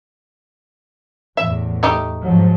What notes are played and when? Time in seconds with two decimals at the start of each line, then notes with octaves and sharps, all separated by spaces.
1.37 E2 A2 E5
1.83 A3 D#4 G4
2.22 G#2 F3 F#3